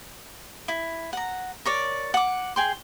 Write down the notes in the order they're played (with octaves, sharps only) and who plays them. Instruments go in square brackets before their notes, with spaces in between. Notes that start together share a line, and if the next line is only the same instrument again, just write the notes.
[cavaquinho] E4
F#5 A#5
A#4 C#5 D5
F#5 D6
G#4 G5 C6